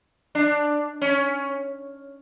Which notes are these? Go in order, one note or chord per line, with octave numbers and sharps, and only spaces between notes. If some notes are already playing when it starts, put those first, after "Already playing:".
D4
C#4